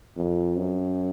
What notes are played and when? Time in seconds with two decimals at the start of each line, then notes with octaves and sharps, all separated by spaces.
0.17 F2
0.57 F#2